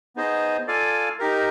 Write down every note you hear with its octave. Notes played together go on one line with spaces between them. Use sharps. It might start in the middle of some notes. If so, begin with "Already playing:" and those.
B3 D#4 G#4 C5 D#5
F4 A4 D5 F5 G#5
D#4 G4 A#4